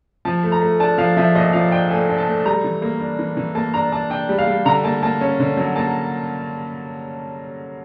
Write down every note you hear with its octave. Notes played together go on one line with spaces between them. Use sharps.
F3 A5
A3
A#5
A3
D4 A5
F3 F5
F3 E5
A#2 D#5
F3 F5
D4 G5
A3 G#5
D4
A5
A3
G3 A#5
E3
A#3
D4
E3
E3
A#3 A5
D4 A#5
D4 A5
D4 G5
G3
F5
G3
D3 A#5
A#3 A5
A#3 A5
C#4
D3
F#3
A#3 A5